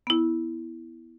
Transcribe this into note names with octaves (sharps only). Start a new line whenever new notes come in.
B3 E4